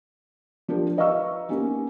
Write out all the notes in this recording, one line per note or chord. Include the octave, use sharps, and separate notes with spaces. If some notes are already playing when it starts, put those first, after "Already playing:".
F3 D4 G4 A#4
B4 D#5 F5 A#5 C#6 E6
A#3 B3 C#4 D#4 G4